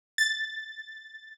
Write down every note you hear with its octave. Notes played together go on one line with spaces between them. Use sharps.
A6